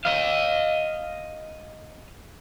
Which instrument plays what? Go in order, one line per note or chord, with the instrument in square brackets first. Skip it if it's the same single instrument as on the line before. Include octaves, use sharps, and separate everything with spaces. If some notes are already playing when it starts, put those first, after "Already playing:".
[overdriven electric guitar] D#5 F5